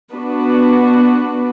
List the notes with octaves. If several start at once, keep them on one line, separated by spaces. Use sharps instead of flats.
B3 D4 F#4 B4